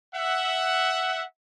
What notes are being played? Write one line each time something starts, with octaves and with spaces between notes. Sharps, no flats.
E5 F#5